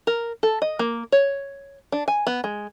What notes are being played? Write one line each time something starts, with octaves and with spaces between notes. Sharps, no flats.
A#4
A4
D#5
A#3
C#5
D4
G#5
B3
G#3